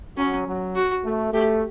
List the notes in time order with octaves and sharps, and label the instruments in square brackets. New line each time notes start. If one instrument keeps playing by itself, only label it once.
[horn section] F#3 [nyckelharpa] C#4
[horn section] F#3
[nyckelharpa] F#4
[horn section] A3
[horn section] A3 [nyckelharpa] G4